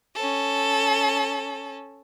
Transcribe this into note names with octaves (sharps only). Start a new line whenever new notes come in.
C#4 A4